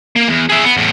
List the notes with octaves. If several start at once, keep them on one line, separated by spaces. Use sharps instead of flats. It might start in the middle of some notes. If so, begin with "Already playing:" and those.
A#3
E2
G#4 E5
B3
E2 A2